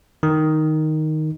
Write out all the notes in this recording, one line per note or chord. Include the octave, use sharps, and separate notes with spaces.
D#3